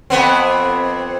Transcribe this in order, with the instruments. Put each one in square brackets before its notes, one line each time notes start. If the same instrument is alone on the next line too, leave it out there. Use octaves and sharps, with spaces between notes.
[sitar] F2 B3 C4